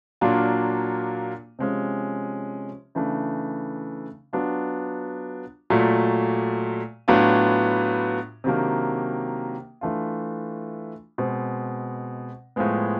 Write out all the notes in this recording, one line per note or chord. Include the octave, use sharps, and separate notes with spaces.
A#2 F#3 A#3 D4 F4
C3 F3 G#3 C#4
C#3 E3 A3 D4
F#3 B3 D4 F4
A#2 F#3 A3
A2 F#3 B3 D4 F4
C3 D#3 F#3 A#3 D4
E3 A3 D4 F4
B2 G#3 C4
A2 F3 G#3 B3